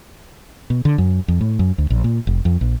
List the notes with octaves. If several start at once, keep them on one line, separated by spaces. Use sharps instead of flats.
B2
D3
F#2
F2
A2
F#2
D2
A#1
A#2
F1
F2
A#1